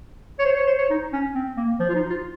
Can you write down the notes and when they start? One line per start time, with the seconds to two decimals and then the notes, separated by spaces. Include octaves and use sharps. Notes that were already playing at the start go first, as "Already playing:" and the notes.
0.39 C#5
0.45 C5
0.57 C#5
0.67 C5
0.78 C#5
0.90 D#4
1.13 C#4
1.35 C4
1.57 A#3
1.80 F3
1.89 F4
1.95 D#4
2.10 F4